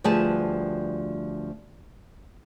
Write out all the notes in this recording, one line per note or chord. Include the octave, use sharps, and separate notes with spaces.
D2 F3 G3 G#4 B4 A5